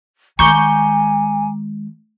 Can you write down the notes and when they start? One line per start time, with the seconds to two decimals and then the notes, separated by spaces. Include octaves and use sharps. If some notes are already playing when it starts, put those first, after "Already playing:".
0.39 D#3 G#3 G#5 A#5 C#6 D6 G6 C#7